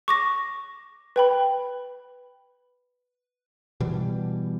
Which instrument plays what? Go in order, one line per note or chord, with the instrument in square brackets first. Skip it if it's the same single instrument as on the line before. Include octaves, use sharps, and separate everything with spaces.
[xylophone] C#6 D6 A#6
B4 G5 B5
[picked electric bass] B2 E3 G3